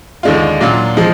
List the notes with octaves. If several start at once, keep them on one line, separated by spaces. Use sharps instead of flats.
D#2 D3 G#3 D4 F4
A#2 F#3 D4 F4
F3 G#3